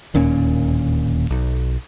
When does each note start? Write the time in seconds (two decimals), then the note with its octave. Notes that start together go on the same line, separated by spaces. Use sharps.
0.14 D1 D#2 A#2 C#4
1.30 B1